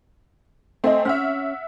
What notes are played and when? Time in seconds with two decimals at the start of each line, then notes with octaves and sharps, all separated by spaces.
0.84 A3 C4 D#5 G#5
1.05 C#4 E5 F#5 F6